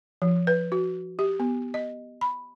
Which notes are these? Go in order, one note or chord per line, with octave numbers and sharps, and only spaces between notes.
F3
B4
F#4
G4
B3
D#5
B5